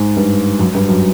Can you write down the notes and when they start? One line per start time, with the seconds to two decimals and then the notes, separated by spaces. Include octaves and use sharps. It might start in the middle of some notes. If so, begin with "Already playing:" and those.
Already playing: G#2
0.17 G2
0.59 F#2
0.75 G2
0.89 F#2